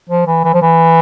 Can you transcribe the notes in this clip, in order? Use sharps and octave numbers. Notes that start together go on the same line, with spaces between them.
F3
E3
E3
F3
E3